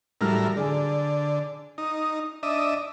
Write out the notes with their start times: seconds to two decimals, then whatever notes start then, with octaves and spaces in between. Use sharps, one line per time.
0.21 A2 E3 F#3 G3 A#4 F6
0.57 D3 G#4 G#5
1.78 D#4
2.43 D4 D#5 E5